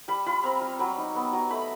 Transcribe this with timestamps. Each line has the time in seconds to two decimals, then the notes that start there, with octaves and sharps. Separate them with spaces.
0.08 G3 B5
0.26 F4 B5
0.44 C4 A#5
0.61 G3
0.79 F#3 B5
0.97 D#4
1.16 B3
1.33 F#3
1.50 A3 B5